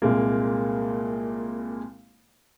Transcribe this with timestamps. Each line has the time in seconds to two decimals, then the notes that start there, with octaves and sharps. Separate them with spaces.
0.02 C2 A#2 G#3 A#3